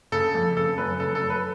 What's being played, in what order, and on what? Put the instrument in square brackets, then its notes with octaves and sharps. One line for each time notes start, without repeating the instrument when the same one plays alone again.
[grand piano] C#3 A4
F2
C#3 A4
F#2 B4
C#3 A4
A4
F#2
B4